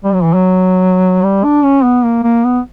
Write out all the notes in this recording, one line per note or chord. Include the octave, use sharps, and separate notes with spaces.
G3
F#3
E3
F#3
G3
D4
C#4
B3
A#3
A#3
B3